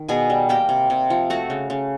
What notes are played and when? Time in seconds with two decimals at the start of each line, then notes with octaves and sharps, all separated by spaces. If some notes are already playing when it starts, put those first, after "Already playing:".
Already playing: D#3
0.09 B2 G#4 G#5
0.30 G3
0.49 A#3 G4 G5
0.69 C3
0.90 C3
1.10 F3
1.30 A3 F#4 F#5
1.50 C#3
1.70 C#3